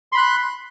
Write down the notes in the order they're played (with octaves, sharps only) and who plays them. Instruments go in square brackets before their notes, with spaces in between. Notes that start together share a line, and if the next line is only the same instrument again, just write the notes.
[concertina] C6
B5
F#6